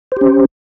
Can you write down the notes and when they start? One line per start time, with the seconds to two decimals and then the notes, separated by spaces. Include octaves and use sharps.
0.12 C5
0.17 G4
0.21 C#4